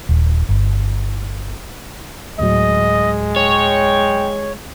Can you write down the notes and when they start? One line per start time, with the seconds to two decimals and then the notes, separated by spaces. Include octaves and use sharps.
0.09 D#1
0.49 G1
2.39 D2 A2 F#3 G#3 D#5
3.36 C#5 G5